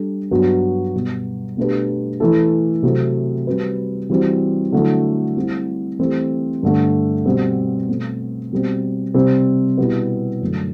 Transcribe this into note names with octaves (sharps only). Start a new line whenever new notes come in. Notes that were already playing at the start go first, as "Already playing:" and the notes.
Already playing: G3 D4 A4
G2 F#3 B3 F#4
B2 G3 B3
B2 A3 D4 G4 B4
E3 A3 E4 A4
C3 F#3 A3 C4 F#4
G3 C4 F#4 B4
E3 G3 C4 F#4
D3 F#3 A3 E4
G3 C4 E4
E3 A3 C4 G4 C5
G2 D3 A3
B2 G3 C4
B2 A3 C4
B2 G3 C4
C3 G3 C4
B2 G3 B3 E4 B4
F#2 D3 A3